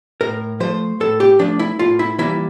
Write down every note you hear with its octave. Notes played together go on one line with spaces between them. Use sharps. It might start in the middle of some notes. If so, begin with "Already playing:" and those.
A2 A#4
F3 A3 C5
A2 A4
G4
F3 A3 D4
E4
A2 F4
E4
E3 G3 A#3 E4